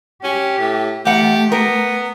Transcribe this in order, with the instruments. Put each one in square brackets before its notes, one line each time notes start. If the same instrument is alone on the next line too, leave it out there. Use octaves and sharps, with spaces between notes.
[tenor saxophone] C#4 [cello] G4
[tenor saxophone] A2
[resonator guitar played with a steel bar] E2 F#5 [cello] A3 [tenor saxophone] G4
[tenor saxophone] B3 [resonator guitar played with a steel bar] A#4